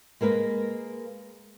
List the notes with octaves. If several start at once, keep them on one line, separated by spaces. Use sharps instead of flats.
G#3 A#3 A#4 B4